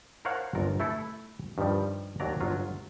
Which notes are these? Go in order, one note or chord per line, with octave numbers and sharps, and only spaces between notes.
A#4 C5 C#5 F5 F#5 A5
G1 F4 A#4
A3 E4 A4
G2 D#3 F3 G3
D#2 F#3 D5 A#5
G1 F#3 F4